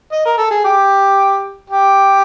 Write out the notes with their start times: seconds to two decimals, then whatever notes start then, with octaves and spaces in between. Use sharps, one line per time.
0.12 D#5
0.25 A#4
0.38 A4
0.51 G#4
0.64 G4
1.70 G4